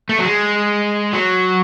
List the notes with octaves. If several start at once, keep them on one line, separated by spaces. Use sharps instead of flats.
A3
F#3
G#3
F#3